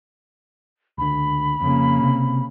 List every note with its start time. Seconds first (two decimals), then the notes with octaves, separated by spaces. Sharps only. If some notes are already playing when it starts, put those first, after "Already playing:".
0.98 C#2 D3 B5
1.61 F2 C#3 A#3
2.02 C3 C4